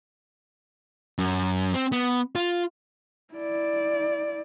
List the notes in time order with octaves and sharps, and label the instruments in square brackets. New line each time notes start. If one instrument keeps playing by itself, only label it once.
[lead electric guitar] F#2
C4
B3
F4
[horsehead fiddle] E4 D5